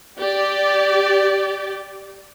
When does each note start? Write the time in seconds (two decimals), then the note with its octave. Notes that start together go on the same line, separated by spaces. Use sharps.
0.19 G4 D5